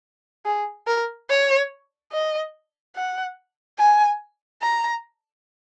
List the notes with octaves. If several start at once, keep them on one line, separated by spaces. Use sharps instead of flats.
G#4
A#4
C#5
D#5
F#5
G#5
A#5